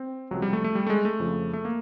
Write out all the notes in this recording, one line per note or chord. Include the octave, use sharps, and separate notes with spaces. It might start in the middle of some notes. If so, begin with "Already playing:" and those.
Already playing: C4
C#2 C3 F3 F#3
G3
A3
A3
G3
A3
G#3
A3
F2 C#3 F3
A3
A#3